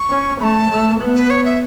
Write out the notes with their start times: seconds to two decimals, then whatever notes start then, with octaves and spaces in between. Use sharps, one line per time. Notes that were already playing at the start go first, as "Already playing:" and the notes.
Already playing: C#6
0.10 C#4
0.40 A3 A5 B5
0.70 A3
1.00 B3
1.15 B4
1.30 C#5
1.45 E5